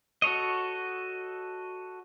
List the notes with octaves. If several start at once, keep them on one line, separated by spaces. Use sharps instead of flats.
F#4 A4 C#5 D#5